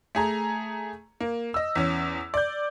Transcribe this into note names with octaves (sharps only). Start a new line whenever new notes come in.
A3 G#4 A#5
A#3
D#5 E6
E2 C#4
D5 G6